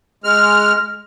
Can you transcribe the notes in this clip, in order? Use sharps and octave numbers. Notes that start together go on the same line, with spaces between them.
G#3 F6